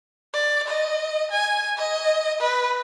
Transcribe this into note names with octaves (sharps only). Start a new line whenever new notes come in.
D5
D#5
G#5
D#5
B4